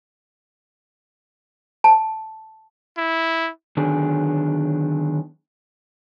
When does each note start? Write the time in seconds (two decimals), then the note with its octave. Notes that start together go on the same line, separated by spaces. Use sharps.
1.84 A5
2.97 E4
3.77 D3 D#3 F#3 B3 D4 G#4